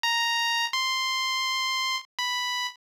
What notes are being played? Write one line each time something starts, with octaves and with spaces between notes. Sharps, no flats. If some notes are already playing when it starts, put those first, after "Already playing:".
A#5
C6
B5